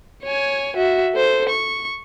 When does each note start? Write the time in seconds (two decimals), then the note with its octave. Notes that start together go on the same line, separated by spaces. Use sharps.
0.23 C#5 G#5
0.76 F#4 E5
1.14 A4 C5
1.49 C#6